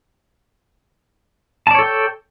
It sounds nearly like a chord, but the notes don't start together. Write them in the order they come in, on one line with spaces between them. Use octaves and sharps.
A5 D5 C#5 A4 G5